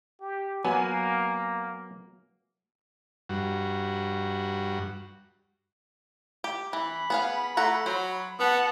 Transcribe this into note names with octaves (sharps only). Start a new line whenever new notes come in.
G4
F#3 A#3 B3 G#5
G2 F#4
G4
E3 B5
B3 G#4 F5
A3 C#5 F#5 A#5
F#3 C5
B3 F#5 A5